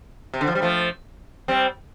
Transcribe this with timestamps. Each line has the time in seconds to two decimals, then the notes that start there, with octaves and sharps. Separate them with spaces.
0.34 C3
0.41 D3
0.48 F3
0.55 G3
0.62 F3 A3
1.48 G3 C4